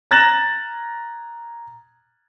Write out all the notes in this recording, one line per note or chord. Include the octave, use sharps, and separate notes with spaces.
A#5 F#6 A6 A#6 E7 F#7